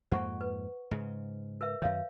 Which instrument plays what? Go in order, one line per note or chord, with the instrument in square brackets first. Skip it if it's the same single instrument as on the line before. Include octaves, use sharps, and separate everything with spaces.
[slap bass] F2 G#2 A#3 [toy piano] C5 F#5 C#6
[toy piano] B4
[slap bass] G#2 C#3
[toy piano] A#4 B4 E5
[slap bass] F#2 D#3 [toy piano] C#5 E5 F5